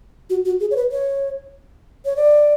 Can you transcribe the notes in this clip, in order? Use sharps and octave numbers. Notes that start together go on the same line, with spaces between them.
F#4
F#4
G#4
C#5
B4
C#5
C#5
D5